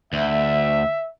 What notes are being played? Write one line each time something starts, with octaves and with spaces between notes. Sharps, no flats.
D2 E5